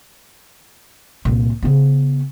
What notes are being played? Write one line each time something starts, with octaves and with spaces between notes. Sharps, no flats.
C2 A#2
C#3 B3